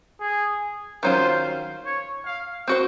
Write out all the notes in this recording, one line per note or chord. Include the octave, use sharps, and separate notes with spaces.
G#4
D#3 F#3 C#4 F4 C5
C#5
F5
C4 F#4 C5